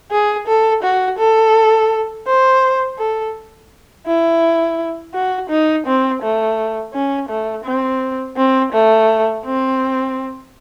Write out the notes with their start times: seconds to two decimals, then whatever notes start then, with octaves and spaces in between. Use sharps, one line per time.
0.11 G#4
0.47 A4
0.83 F#4
1.19 A4
2.27 C5
2.98 A4
4.07 E4
5.14 F#4
5.50 D#4
5.86 C4
6.22 A3
6.93 C#4
7.29 A3
7.65 C4
8.37 C4
8.72 A3
9.45 C4